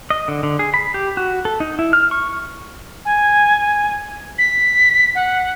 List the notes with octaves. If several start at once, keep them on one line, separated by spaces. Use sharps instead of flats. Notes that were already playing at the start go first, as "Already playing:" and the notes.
D#5
D3
D3
G#4
B5
G4
F#4
A4
D#4
E4
F6
C#6
G#5
B6
F#5